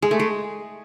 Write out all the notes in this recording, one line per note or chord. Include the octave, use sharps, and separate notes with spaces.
G#3 G#4
A3
G#3